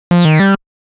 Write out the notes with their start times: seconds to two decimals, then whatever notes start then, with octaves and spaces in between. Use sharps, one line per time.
0.11 F3
0.25 D#3
0.40 G3